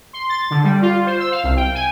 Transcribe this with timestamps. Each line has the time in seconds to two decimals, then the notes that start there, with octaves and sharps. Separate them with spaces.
0.13 C6
0.29 A6
0.50 D3
0.64 G3
0.82 F4
1.06 C5
1.20 E6
1.32 F5
1.44 C2
1.57 G5
1.75 G#5